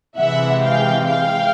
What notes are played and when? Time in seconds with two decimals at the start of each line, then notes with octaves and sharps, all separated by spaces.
0.17 C3 E3 G#3 E5 F#5
0.62 F5 G5
1.06 F5 G5